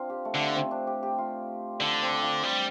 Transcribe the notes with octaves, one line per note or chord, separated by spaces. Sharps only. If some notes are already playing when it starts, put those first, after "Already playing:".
Already playing: C4 D4 F4
G4
A3
D3 A3
C4
D4
G4
G4
F4
D3 D4
C4
F4
G3